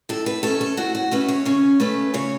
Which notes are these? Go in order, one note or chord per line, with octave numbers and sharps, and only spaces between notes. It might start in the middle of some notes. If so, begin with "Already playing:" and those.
A2 A4
B4
A3 C#4 A4
A4
A2 F#4
F#4
A3 C#4 B4
C#5
C#3 C#4
A3 C#4 B4
C#3 C#5